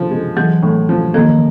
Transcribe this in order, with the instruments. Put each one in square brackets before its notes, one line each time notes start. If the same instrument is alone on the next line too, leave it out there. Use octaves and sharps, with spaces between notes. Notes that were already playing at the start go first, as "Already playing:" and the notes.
Already playing: [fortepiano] F3
G#3
[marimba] E3 F#3 [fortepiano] G#3
[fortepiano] A2
F3
[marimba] D#3 F3 [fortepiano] A#3